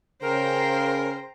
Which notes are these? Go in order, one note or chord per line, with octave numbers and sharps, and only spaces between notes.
C#3 A#4 C5 G5 A#5